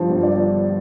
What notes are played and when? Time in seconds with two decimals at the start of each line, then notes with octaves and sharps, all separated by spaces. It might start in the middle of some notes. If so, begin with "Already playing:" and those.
Already playing: G2 F3 C5
0.09 G1
0.23 D5